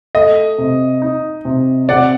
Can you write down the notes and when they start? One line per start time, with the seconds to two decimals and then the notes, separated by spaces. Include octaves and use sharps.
0.15 A3 D#5
0.58 C3
1.02 D#4
1.45 C3
1.89 C3 D5 F#5